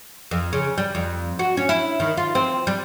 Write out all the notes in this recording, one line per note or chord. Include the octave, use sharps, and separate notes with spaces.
F2
C#3
G3
F2
F#4
C#4
E4
D#3
F4
C4
G3